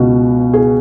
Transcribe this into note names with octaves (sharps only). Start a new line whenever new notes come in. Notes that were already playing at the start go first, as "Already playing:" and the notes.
Already playing: C#2 B2 F#4
G#4